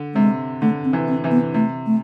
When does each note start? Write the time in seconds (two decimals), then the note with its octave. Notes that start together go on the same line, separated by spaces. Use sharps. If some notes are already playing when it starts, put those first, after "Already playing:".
Already playing: D3
0.15 C3 G#3
0.62 D3 A3
0.84 C4
0.93 C3 E3
1.08 C4
1.24 C3 E3
1.31 B3
1.54 C3 A3
1.86 A3